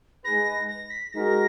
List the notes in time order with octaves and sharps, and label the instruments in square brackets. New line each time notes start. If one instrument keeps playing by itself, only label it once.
[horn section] G#3 D#4 G#4 B4 [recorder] A#6
[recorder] A#6
B6
[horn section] G#3 D#4 F#4 A#4 [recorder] A#6